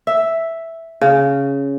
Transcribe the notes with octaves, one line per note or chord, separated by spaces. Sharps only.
E5
C#3